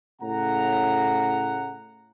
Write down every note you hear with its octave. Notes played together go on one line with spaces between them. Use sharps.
A2 C#3 F#5 A#5